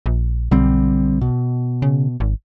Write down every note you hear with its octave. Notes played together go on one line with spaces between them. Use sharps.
A#1
B1 D3 G3 C4
B2
C#3
G#1